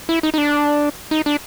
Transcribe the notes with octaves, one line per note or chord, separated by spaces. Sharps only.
E4
D#4
D#4
D4
D#4
D4